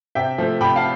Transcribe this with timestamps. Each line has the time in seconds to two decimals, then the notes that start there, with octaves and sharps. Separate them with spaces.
0.15 C3 E5 G5
0.38 F3 A3
0.61 C3 G5 B5
0.76 F5 A5